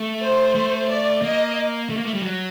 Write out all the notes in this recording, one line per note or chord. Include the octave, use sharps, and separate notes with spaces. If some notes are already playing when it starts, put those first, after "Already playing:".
Already playing: A3
C5
A3
D5
A#3 D#5
A3
A#3
A3
G3
F#3